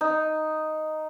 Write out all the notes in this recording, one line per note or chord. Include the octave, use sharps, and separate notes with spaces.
D#4